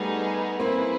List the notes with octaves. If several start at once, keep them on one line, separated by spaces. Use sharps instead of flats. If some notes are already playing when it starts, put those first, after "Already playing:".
Already playing: G3 A3 B3 D#4 G#4
A#3 C4 E4 G#4 B4